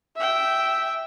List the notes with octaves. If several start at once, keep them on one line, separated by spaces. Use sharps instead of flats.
E5 G5